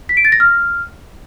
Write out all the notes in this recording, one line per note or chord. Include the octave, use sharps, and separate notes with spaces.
B6
D7
A6
A#6
F6